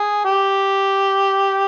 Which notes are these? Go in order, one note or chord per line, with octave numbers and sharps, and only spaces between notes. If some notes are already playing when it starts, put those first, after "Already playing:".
Already playing: G#4
G4